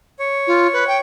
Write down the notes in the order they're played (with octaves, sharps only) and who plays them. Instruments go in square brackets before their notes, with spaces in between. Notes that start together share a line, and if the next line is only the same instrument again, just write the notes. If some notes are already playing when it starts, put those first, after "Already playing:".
[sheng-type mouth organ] C#5
[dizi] F4
B4
G5